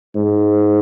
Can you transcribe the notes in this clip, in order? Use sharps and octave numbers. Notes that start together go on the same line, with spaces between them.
G#2